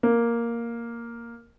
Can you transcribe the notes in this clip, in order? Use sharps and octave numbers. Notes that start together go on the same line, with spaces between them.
A#3